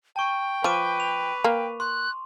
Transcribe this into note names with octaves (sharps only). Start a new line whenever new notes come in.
G5 A5 C#6
F3 B4 C#6 D6 D#7
F7
A#3 G5
C6 F#6